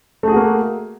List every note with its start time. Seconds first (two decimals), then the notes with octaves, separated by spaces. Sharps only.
0.23 A3
0.28 G#4
0.32 F#4
0.36 A#3